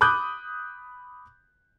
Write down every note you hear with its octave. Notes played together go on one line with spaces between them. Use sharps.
B5 D6 D#6 F#6 G6